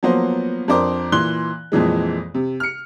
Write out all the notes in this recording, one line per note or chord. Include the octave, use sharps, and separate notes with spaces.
F3 F#3 A#3 B3 C5
F2 D4 A#4 C5 D6
A#2 E3 C6 F#6 G7
F2 A#2 E3 G#3
C3
F6 C#7